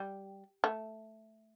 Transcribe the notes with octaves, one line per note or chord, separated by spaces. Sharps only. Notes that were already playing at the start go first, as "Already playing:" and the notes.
Already playing: G3
A3